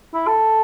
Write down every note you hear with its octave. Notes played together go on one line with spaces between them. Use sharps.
E4
A4